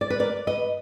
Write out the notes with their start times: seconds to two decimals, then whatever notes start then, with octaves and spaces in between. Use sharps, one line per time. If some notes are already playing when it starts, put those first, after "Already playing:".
0.01 D5
0.10 B4
0.19 A#4 D5
0.47 B4 D#5